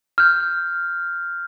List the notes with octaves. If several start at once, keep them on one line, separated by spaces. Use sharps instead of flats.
F6 G6